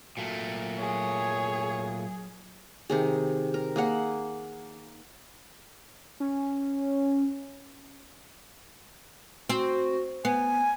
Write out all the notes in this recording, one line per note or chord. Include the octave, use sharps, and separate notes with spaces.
A#2 F#3 A3
G#4 C#5
C3 D#3 G#4
A#4
A#3 G#4 F#5
C#4
C4 F#4
B3 G#5